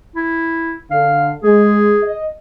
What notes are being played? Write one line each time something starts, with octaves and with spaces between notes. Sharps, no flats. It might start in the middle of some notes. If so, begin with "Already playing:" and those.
E4
D3 F5
G#3 G#4
D#5